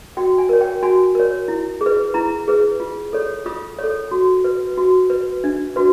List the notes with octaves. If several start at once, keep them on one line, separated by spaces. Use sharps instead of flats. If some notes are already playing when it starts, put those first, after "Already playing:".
F#4 G5
G#5
A#4 C#5
G5
F#4 G#5
A#4 C#5
E4
G#4
B4
E4 A#5
G#4 B4
F4
A4 C#5
F4 D#6
C#5
A4
F#4
B4
F#4
B4
D4
F#4 B4